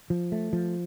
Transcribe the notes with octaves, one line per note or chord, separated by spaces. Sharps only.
F3
A3
F3